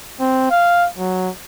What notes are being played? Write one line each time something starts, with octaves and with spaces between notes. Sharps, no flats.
C4
F5
F#3